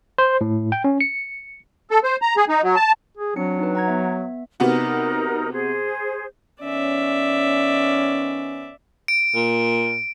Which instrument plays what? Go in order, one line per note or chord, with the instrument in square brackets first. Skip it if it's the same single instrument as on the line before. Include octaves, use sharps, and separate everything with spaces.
[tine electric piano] C5
A2
G5
C#4
C#7
[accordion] A4
C5
A#5
G#4
D#4
F#3
A5
[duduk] G#4
[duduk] F#3 [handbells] C4 D4 C#7
[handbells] D#4 B4
F#5 A#5 G#6
B3 E5
[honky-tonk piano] C3 B3 F#4 [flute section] D#4 A#4
[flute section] G#4 C5
[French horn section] D#3 B3 C#4 [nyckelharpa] D5 E5
[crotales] D7
[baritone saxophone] A#2